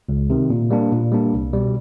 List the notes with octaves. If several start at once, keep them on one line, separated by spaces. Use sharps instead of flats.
C#2
C3 D#3
A#2
G3 A#3 D4
A#2
G3 A#3 D4
C2
B2 G3